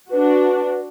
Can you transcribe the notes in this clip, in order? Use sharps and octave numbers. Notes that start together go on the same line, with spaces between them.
D4 F#4 B4